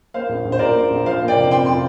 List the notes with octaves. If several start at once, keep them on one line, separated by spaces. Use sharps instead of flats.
A#3 C5 F5
A#1
A#1
C5
A#2 A#4 D5
A#3
A#1
F3 C5 F5
A#3
D5 G5
F1
F2 G5 C6
F3 G5 C6